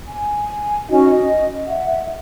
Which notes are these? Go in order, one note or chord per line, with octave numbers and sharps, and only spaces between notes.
G#5
C#4 D#4 F#4 D#5
D#5
E5 F#5